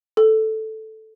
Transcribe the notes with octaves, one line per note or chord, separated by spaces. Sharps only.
A4